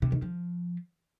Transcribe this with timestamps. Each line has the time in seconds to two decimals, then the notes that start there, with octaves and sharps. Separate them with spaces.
0.02 C3
0.12 D#3
0.22 F3